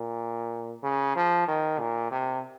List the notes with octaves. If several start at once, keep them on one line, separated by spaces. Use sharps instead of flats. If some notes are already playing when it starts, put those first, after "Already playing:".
Already playing: A#2
C#3
F3
D#3
A#2
C3